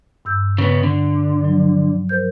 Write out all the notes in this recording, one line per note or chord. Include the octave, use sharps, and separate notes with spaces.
G2 E6 G6
C#3 B3
D3
F3 F#3
A#4 C5 G6